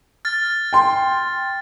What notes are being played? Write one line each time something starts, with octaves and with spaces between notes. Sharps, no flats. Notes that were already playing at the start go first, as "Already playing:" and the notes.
F6 A6
G5 C6